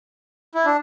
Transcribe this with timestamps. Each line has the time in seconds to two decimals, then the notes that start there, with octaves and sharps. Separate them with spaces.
0.55 E4
0.65 D4